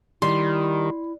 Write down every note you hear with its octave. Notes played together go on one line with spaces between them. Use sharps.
D#3 G3 E4 C6